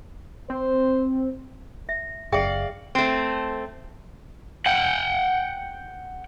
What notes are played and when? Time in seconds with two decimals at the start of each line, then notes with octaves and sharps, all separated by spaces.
0.50 C4 C5
1.89 E5
2.32 F#1 G#4 D5 E5 F5 G5
2.95 A3 C4
4.66 F#5 G5